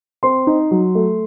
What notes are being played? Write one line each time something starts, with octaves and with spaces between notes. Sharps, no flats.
C4 C6
D#4
F#3
A3